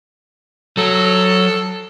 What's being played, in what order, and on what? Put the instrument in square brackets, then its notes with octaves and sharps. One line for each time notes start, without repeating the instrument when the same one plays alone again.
[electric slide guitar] F#3 [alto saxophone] A4